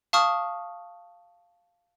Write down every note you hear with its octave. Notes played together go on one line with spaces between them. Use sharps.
F5 A5 C#6 D#6 F6